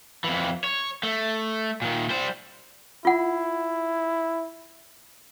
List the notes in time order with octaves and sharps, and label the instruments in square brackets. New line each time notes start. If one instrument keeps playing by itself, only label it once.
[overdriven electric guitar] F2 E3
C#5
A3
A#2 D#3
G3 C5
[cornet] E4 [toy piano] F4 F#5